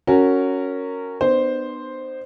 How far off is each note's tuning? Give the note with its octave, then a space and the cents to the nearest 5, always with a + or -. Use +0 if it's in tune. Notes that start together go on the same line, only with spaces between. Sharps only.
C#4 +0 F#4 +0 A#4 -15
B3 +0 D4 +45 C5 +0